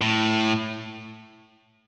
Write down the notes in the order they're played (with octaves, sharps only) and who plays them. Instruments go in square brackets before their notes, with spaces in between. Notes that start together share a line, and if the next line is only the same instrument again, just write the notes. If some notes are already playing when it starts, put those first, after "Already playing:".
[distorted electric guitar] A2